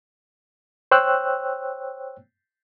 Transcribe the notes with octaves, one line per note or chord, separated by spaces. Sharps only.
C5 C#5 G5 E6 F#6